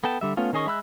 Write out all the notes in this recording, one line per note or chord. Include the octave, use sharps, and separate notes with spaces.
B3 A4 G5 A5
D3 G3 E5
A3 B3 C#4 F4
D#3 C#4 G#4 D#5 C#6
G#3 E5 B5 E6 F#6